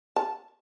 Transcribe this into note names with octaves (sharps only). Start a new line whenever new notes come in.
A5